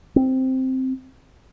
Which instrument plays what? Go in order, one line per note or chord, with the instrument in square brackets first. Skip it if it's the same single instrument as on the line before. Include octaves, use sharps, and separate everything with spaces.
[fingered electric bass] C4